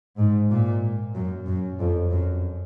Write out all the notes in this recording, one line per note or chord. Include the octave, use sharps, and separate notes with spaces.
G#2
A#2
F#2
F#2
F2
F#2